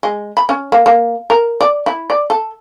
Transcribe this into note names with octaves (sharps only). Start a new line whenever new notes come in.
G#3
B5
C#4
A#3
A#3
A#4
D5
E4
D5
A4